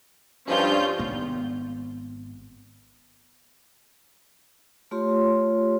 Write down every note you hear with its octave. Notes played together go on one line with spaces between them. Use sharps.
G2 F3 C#4 F4 G6
G#1 B3
A3 F4 G4 C#5 C6